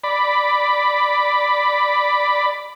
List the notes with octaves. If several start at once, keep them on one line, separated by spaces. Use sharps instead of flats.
D5 B5